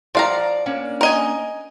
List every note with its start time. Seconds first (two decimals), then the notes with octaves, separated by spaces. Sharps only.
0.15 F3 D5 F5 A#5
0.66 A#3 C#4 D4
1.01 A#4 D#5 G#5